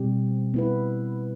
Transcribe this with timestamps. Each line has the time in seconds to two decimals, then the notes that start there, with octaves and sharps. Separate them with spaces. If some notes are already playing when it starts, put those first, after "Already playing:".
Already playing: B2 G3 C4 G4
0.54 B3 E4 B4